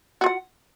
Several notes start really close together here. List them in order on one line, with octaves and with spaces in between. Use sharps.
F#4 F4 F#5